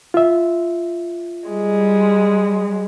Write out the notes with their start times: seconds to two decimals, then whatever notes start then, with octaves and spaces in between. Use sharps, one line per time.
0.14 F4 E5
1.49 G3 G#3